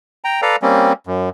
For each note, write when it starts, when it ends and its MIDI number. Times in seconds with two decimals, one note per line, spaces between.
0.24 0.41 79
0.24 0.41 82
0.42 0.56 69
0.42 0.56 71
0.42 0.56 74
0.42 0.56 77
0.42 0.56 82
0.62 0.93 55
0.62 0.93 58
0.62 0.93 60
0.62 0.93 61
1.07 1.29 42